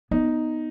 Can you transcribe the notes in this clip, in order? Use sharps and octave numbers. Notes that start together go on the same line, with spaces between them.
B3 D#4